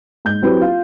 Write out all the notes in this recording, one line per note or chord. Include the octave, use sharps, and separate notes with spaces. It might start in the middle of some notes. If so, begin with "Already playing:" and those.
G#2 G6
F#3 C4 E4 G4 B4
F4 F5